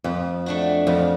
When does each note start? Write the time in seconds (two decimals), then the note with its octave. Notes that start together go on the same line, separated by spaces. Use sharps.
0.04 F2 F3
0.46 A3 D4 F#4
0.87 F2 F3